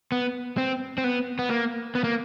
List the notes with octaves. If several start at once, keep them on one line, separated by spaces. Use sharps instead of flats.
B3
C4
C4
B3
B3
A#3
B3
A#3